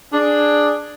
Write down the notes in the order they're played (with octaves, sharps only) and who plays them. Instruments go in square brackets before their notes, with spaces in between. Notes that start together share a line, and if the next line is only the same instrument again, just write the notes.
[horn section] D4 G#4